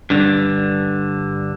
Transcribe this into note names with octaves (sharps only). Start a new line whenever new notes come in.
G2 D3